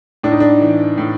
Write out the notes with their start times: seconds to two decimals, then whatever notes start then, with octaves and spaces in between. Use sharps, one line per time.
0.23 A2 D4
0.32 D#4
0.40 D4
0.61 E3
0.98 A2